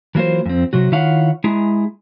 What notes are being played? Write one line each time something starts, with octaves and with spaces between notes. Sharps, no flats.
E3 F#3 A#3 F4 C5
F2 C4
C3 F#3 F#4
D#3 E4 F4 C#5 F5 F#5
G#3 E4 G#4 A#5